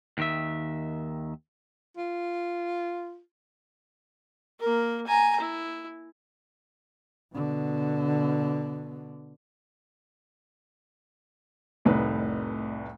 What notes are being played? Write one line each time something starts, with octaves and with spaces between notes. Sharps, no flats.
D#2 D#3 E5
F4
A#3 A#4
G#5 A#5
E4
B2 D3
F1 C2 A2 D#4 B4